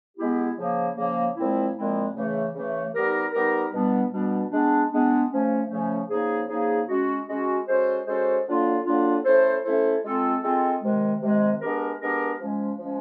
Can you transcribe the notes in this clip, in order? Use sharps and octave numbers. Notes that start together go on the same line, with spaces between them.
G#3 B3 E4 G4
C#3 F3 A#3
C#3 F3 A#3
A#2 F3 G#3 C4 E4
A#2 F3 G#3 C4 E4
C#3 E3 A3
C#3 E3 A3
G3 B3 D#4 G4 A#4
G3 B3 D#4 G4 A#4
B2 G3 B3 D4
B2 G3 B3 D4
G#3 B3 D4
G#3 B3 D4
C#3 F3 A3 C#4
C#3 F3 A3 C#4
C#3 F3 A#3 D#4 G#4
C#3 F3 A#3 D#4 G#4
G#3 C#4 F#4
G#3 C#4 F#4
G#3 C#4 F#4 A4 C5
G#3 C#4 F#4 A4 C5
D3 F#3 A#3 D4 F4
D3 F#3 A#3 D4 F4
A3 C#4 E4 A4 C5
A3 C#4 E4 A4 C5
G#3 C4 F4 A4
G#3 C4 F4 A4
C3 D#3 G#3
C3 D#3 G#3
G#3 B3 D4 G4 A#4
G#3 B3 D4 G4 A#4
F3 G#3 C#4
F3 G#3 C#4